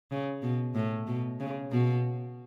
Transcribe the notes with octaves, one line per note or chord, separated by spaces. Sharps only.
C#3
B2
A2
B2
C#3
B2